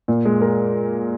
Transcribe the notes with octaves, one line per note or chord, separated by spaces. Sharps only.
A#2
G#3
A#4